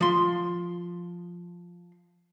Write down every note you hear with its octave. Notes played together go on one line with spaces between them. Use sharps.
F3 C6